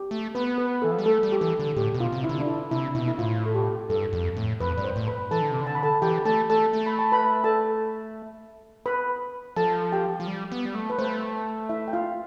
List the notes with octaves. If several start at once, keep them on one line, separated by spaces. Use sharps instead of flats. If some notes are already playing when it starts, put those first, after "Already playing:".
Already playing: G4
A3
B3 B4
B4
E3 A4
F3
G3
A3 A4
G3
G4
E3 A4
D3
A2 G4
B2
F4
C3
E4
D3
D4
E4
C3 E4
B2 E4
E4
A2 F4
A4
G4
G2 A4
F2
A2
F2 B4
G2 D5
C5
A2
B4 B5
E3 A4 A5
D3
C3
D3
A5
B5
A4 A5
E3 G4 G5
B5
A3 A4 A5
A3 A4 A5
A3
B5
A5
B4 B5
A4 A5
B4 B5
F3 A4 A5
G4 G5
F3
G3
B3
G3
A3
B4
A3 C5
E4 E5
G5
F4 F5